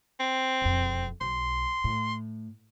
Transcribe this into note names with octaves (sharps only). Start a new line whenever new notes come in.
C4
E1 F2
B1 C6
A2